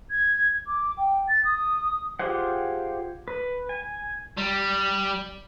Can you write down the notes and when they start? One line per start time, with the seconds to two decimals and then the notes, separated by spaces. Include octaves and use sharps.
0.10 G#6
0.67 D6
0.98 G5
1.28 A6
1.45 D#6
2.19 F4 G4 G#4 C5 F#5
3.28 B4
3.69 G#5
4.38 G3